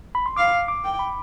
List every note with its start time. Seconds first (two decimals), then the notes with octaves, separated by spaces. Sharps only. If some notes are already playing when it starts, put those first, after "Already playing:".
0.15 B5
0.26 C6
0.36 F5 D6
0.68 D6
0.84 G5
0.99 B5